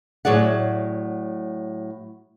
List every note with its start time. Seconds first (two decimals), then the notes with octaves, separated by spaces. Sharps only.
0.25 A2 F#3 G#4 D5 F#5